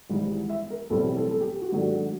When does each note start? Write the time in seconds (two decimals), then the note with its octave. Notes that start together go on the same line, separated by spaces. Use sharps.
0.10 G#1 G#2 E3 G3
0.49 E5
0.70 A#4
0.90 B1 A2 E3 G3 C4 A4
1.17 A4
1.31 A4
1.40 G4
1.62 F#4
1.72 G#2 D#3 F#3 A3 D4